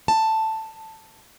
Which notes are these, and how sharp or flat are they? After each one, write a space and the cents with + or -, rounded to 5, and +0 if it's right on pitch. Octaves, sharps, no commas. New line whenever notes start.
A5 +5